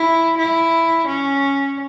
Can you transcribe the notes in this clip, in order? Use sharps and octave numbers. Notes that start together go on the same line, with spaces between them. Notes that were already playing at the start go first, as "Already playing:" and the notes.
Already playing: E4
E4
C#4